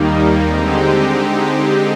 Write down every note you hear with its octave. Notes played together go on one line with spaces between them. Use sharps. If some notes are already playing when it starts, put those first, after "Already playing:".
Already playing: D#2 D#3 G3 A#3 D#4
D3 G#3 C4 D#4 G4